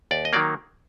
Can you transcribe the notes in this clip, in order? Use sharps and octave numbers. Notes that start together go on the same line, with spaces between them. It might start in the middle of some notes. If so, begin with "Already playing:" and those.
D#2 D5
D#5
D#3 F#3 A#3 D5